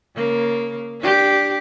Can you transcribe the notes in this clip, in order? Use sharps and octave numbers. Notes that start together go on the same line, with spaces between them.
C#3 A#3
D4 G4